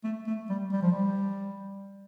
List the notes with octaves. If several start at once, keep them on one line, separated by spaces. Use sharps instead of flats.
A3
A3
G3
G3
F3
G3